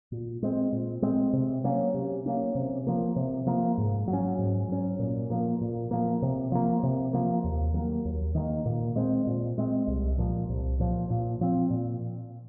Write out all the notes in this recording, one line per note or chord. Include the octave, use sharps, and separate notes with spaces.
A#2
G#3 C4
A#2
G#3 C4
C3
F#3 A#3 C#4
C3
F#3 A#3 C#4
C3
F3 A#3
C3
F3 A#3
G#2
F#3
C#4
G#2
F#3 C#4
A#2
F3 A#3
A#2
F3 A#3
C3
F3 A#3
C3
F3 A#3
D#2
D#3 F#3 A#3
D#2
D#3 F#3 A#3
A#2
G#3 C4
A#2
G#3 C4
C2
A#2 F3
C2
A#2 F3
A#2
F3 C4
A#2